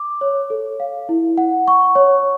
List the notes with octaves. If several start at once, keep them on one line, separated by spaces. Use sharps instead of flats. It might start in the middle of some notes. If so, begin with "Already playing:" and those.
Already playing: D6
C#5
A4
F5
E4
F#5
C#6
C#5